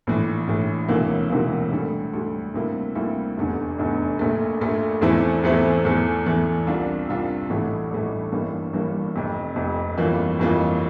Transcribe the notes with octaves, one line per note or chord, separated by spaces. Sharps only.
A#1 A2 E3
A#1 A2 E3
E1 D2 C3 E3 A#3
E1 D2 C3 E3 A#3
D2 D3 G3
D2 D3 G3
D2 C3 G3 A#3 E4
D2 C3 G3 A#3 E4
F1 E2 D3
F1 E2 D3
A#1 A#2 A3
A#1 A#2 A3
E2 E3 A3 C4 E4
E2 E3 A3 C4 E4
E2 E3 A3
E2 E3 A3
C2 C3 G3 D4 F4
C2 C3 G3 D4 F4
A1 G2 E3 A3
A1 G2 E3 A3
G1 G2 E3 G3 A#3
G1 G2 E3 G3 A#3
F1 F2 C3
F1 F2 C3
G1 F2 E3 A#3 F4
G1 F2 E3 A#3 F4